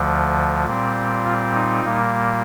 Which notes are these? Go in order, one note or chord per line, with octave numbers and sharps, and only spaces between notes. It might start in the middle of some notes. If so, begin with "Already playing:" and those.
Already playing: D2 D3 F3
A#2 G3 C4
F4
D#4
A#2 G3 A#3